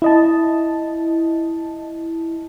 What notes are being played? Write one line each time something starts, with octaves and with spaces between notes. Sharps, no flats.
E4 D#5 A5